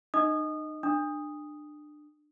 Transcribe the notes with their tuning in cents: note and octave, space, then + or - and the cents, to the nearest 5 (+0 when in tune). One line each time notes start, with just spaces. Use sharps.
D#4 -35 D#5 +10 D#6 -20
D4 +25 D#6 +0